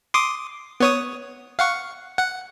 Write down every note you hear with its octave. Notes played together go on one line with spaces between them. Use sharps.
C6 D6 D#6
B3 C#5 D#6
F5 F#5 C#6
F#5